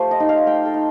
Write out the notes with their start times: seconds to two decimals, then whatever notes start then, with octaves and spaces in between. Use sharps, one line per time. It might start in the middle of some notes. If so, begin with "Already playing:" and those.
Already playing: F3 A3 F4 G4 C5
0.11 D#5
0.20 D#4
0.29 F5
0.46 A3 G5
0.65 A4
0.74 D#4